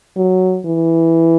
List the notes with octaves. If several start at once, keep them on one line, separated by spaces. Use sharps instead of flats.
F#3
E3